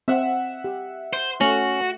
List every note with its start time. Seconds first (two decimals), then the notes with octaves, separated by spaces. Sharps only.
0.08 C4 E5 F#5
0.64 G4
1.13 C5
1.41 A3 C#4 F#4